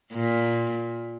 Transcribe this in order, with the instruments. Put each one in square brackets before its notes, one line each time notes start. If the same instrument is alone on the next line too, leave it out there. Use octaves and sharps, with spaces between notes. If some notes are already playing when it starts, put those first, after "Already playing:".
[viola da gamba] A#2